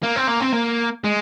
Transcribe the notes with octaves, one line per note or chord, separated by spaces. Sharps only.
A#3
C4
A#3
C4
A#3
G#3